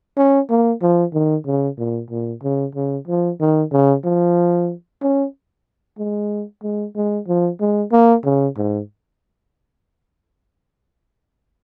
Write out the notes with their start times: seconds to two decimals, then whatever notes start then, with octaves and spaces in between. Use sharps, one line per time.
0.17 C#4
0.50 A#3
0.82 F3
1.13 D#3
1.46 C#3
1.78 A#2
2.10 A#2
2.43 C#3
2.75 C#3
3.08 F3
3.40 D#3
3.72 C#3
4.04 F3
5.02 C#4
5.98 G#3
6.63 G#3
6.96 G#3
7.28 F3
7.60 G#3
7.92 A#3
8.25 C#3
8.57 G#2